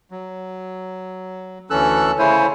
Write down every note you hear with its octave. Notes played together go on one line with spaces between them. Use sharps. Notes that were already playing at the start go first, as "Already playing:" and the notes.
F#3
D2 E3 C#4 A4 E6 F#6
C#3 A3 E4 C5 C#5 G#5